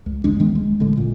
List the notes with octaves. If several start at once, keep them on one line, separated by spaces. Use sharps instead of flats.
C#2
G1 C#2 G#3 D4
D#3 G#3 B3
D#1 G#3
A1 D3 G#3
A#2